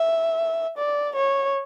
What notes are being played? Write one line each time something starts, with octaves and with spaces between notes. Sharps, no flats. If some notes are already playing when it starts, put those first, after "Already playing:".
Already playing: E5
D5
C#5